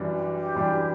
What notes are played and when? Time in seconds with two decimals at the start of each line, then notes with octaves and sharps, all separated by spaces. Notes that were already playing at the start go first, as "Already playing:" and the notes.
Already playing: F#2 E3 G3 D4
0.14 G4
0.35 G4
0.55 F#2 E3 G3 D4